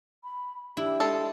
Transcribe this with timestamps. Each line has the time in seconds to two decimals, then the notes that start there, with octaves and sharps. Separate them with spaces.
0.24 B5
0.77 D4 E4 G4
1.00 G#3 A4